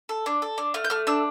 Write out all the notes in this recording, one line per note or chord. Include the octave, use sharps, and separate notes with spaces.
A4
D4
A4
D4
A3 F6
G6
A3 F6
D4 E6